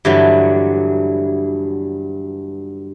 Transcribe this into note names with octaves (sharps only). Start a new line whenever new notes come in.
G2 D3 E3 F#3